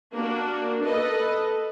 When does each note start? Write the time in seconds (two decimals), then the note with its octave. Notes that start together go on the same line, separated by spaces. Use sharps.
0.14 A#3 D4 F#4
0.85 A4 B4 D#5